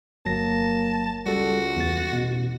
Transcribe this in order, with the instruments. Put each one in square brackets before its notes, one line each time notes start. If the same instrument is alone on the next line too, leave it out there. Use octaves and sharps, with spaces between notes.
[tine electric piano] G1 F#3 A#6 [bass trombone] A#3 [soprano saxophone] A5
[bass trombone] C#2 [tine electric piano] G3 A4 [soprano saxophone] F#4
[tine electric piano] E2 A6
[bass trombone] A1 [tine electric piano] B2